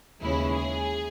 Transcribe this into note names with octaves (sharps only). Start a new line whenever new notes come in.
D#2 C#3 E3 G#3 C#4 E4
G#4